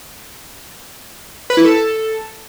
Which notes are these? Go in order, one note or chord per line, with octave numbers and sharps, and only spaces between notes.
B4
E4
A4